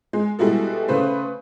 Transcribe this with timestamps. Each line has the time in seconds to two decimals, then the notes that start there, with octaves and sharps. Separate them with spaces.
0.13 G#3
0.39 B2 G3 G#3 E4 F#4 A4
0.88 C#3 A3 B4 C5